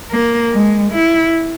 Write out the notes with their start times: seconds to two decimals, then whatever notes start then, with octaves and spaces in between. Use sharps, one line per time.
0.11 A#3
0.52 G#3
0.93 E4